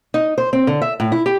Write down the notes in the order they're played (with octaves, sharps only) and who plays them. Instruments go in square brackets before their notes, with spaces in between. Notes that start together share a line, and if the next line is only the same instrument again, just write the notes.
[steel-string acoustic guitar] D#4
C5
C4
D3
E5
A2
E4
G4